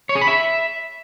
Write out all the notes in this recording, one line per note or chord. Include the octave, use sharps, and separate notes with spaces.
C#5
G#4
B5
E5